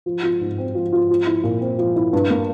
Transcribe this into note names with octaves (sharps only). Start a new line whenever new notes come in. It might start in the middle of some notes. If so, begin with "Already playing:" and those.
F3
F4
G#2
C4
F3
F4
F3
E4
A#2
C4
F3
E4
G2
A#3